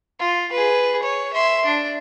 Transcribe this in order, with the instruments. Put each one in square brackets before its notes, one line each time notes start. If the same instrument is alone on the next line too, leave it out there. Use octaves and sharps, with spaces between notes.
[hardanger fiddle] F4
G#4 B4
C#5
E5 C6
D4